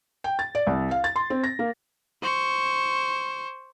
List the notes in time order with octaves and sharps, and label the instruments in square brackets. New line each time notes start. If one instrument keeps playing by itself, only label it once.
[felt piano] G5
A6
D5
C2
F5
A6
C6
C4
A#6
A#3
[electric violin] C5 C#6